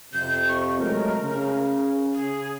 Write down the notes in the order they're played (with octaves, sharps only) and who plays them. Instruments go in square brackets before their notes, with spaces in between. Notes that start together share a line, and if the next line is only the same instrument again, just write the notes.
[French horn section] F2 C3 [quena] G6
[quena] C#6
[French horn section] F#3 G#3 A3 [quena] A#4
[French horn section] C#3
[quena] G#4